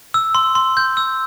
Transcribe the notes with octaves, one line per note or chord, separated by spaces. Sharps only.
E6
C6
C6
G6
E6